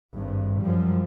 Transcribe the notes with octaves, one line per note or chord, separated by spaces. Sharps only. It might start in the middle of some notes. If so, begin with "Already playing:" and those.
G#1 G2
F#2 F3 G3